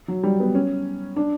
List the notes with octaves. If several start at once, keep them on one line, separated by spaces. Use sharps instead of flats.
F#3
G3
B3
C#4
D4